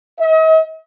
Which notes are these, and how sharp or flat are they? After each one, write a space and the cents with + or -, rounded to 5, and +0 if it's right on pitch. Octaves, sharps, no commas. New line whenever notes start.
D#5 +45